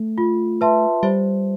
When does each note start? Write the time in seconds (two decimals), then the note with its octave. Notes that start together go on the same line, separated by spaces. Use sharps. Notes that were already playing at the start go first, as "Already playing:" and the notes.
Already playing: A3
0.18 F4
0.61 B4 E5 A5 C6
1.03 G3 C5